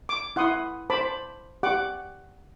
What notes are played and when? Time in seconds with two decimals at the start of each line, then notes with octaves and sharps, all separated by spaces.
0.09 D6
0.36 E4 F#5 C6 D#6
0.90 C5 A5 B5 D6
1.63 G4 F#5 D6